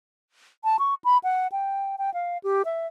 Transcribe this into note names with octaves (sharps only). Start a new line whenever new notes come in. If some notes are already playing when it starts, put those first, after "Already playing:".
A5
C#6
B5
F#5
G5
G5
F5
G4
E5